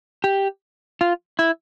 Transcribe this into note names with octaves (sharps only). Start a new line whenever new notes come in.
G4
F4
E4